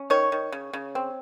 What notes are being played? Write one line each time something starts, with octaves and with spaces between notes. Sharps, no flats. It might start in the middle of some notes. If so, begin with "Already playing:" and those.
Already playing: C#4
D#3 C#5
D#3
C#3
C#3
C4